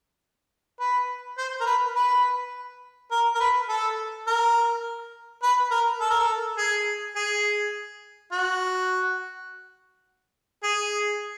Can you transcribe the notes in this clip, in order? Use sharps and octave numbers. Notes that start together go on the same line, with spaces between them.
B4
C5
A#4
B4
B4
A#4
A#4
B4
A4
A#4
B4
A#4
A4
A#4
A4
G#4
G#4
F#4
G#4